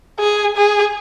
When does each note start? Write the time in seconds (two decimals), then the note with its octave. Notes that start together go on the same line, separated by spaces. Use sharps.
0.19 G#4
0.56 G#4